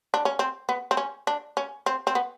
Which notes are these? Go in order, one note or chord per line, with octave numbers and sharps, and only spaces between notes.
D4
C#4
C4
B3
C4
C#4
D4
C#4
C4
C4
B3